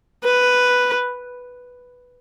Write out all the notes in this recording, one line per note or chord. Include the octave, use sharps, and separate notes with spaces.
B4